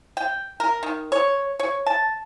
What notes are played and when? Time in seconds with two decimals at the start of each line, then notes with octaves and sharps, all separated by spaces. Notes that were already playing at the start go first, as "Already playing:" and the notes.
0.17 G5
0.60 A#4
0.83 D#3
1.12 C#5
1.59 C#5
1.86 A5